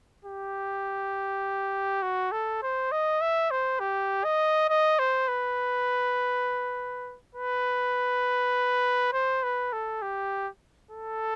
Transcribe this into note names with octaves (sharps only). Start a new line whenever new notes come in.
G4
F#4
A4
C5
D#5
E5
C5
G4
D#5
D#5
C5
B4
B4
C5
B4
A4
G4
A4